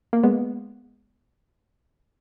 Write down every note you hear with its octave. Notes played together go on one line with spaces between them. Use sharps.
A#3
G#3 B3